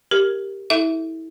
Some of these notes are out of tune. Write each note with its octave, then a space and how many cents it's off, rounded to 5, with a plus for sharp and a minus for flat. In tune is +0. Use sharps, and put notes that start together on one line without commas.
G4 +0 A#4 +0
E4 -30 A4 -5 E5 +0